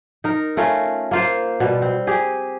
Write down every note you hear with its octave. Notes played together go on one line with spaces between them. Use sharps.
D#4 A#4
A3 C#4 F4 A#4
A#3 F4 C5
B2 G3
C4
G4 G#4